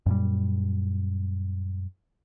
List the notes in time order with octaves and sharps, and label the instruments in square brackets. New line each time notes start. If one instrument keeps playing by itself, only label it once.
[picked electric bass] F#2 A#2 G3